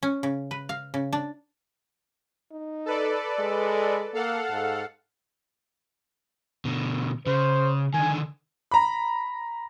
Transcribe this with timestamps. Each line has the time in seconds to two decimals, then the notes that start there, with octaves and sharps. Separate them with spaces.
0.03 C#4
0.23 C#3
0.51 B4
0.69 F5
0.94 C#3
1.13 D4
2.52 D#4
2.86 A4 B4 D5
3.39 G#3
4.14 A#3 A4 F5 F#5
4.50 G#2
6.65 B2 D3
7.26 C#3 C5
7.94 D3 D#3 G#5
8.71 A#5 B5